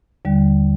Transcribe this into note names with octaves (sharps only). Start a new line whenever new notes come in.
D#2 D3 G3